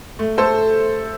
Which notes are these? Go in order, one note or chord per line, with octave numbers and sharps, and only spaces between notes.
A3
A3 A4 C5